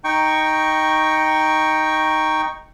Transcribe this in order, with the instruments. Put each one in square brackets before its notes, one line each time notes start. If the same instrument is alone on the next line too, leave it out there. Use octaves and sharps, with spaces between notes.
[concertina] D#4 G5 C#6